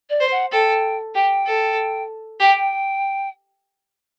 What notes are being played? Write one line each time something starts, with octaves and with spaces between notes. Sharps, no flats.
D5
C5
F#5
A4 G5
G4 G5
A4
G4 G5